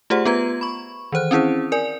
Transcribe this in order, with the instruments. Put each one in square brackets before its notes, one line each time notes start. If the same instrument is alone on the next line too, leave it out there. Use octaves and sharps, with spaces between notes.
[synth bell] A3 F4 G4 G#4 C5 F#5
B3 F4 B4 A#5 G#6
B5 C#6
D#3 E3 C5 F#6
C4 C#4 E4 G#4 C5
A#4 D5 G#5